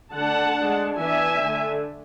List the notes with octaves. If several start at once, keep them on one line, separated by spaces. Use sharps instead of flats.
D3 A3 D4 F#5 A5
G#3 D4
E3 B3 D4 E5 G#5
D3 A3 D4